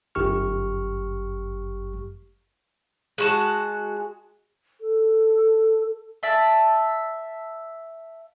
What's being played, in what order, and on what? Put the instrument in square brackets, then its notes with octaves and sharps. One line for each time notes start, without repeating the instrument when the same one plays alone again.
[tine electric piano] G1 F#2 G4 C#6 F6
[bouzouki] G#3 F#4 A5
[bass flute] A4
[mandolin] D5 E5 A5